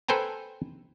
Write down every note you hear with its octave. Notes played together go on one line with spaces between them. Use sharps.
A4 B4 C5 G5 G#5 A#5